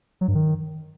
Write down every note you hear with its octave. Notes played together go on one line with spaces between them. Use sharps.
F#3
G2
D#3